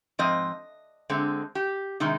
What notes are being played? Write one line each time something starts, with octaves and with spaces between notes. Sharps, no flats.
G#2 F3 C4 D#5
D3 G#3 C4
G4
C3 D#3 G#3 D#4